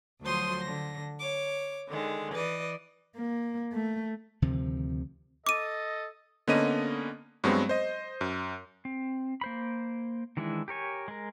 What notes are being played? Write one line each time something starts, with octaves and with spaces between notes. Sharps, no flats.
D2 F3 F#3 C5 C6 D#6
D3 A#6
C#5 D6
D3 D#3 G#3
E3 B4 D5 D#5
A#3
A3
D2 C3 D#3 F3
A4 D#5 D6 D#7
D3 A#3 B3 C#4 D#5 D#7
G2 F#3 G#3 B3 C4
C5 D#5
F#2
C4
A#3 C5 B5
D#3 E3 G#3 D4 E4
G4 A#4 C#5 G#5
G#3 A#4